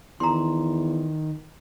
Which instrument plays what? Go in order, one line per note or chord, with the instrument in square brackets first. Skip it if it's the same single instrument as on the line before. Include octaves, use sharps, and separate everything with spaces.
[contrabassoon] E2 [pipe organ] D#3 [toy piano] A#5 C6